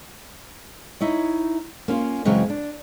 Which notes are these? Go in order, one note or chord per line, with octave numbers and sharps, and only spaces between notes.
D#4 E4 C#5 D#5
A#3 C#4 F4
F#2 C#3 E3 F#3 G#3 C4
D4